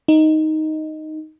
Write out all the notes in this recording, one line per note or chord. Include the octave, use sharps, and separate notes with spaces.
D#4